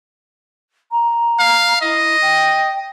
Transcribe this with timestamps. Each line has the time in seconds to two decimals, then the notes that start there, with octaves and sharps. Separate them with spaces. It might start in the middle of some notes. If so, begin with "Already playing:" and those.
0.92 A#5
1.39 F5
1.82 E4 D#5
2.22 G5